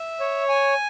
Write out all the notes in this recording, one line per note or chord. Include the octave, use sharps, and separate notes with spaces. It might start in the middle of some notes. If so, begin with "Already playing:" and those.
Already playing: E5
C#5
G#5